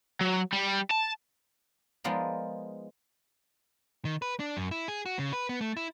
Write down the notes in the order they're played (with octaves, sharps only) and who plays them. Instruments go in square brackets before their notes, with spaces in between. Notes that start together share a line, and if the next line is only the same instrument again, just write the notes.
[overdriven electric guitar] F#3
G3
A5
[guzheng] F3 G#3 B3 D#4 A#4 D5
[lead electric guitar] D#3
B4
D4
F#2
E4
G#4
F#4
C#3
B4
B3
A3
E4